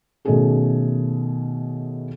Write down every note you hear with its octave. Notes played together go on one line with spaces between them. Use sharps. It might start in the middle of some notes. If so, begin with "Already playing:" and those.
B2 D#3 A3 C#4 G#4 A4